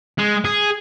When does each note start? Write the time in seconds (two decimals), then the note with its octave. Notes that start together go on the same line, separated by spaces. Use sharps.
0.19 G#3
0.45 G#4